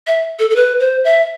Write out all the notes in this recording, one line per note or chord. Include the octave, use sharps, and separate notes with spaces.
E5
A4
A4
B4
C5
E5